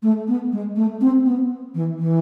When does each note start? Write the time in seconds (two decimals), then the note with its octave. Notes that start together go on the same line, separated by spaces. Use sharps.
0.03 A3
0.28 B3
0.52 G#3
0.76 A3
1.01 C4
1.26 B3
1.75 E3
1.99 E3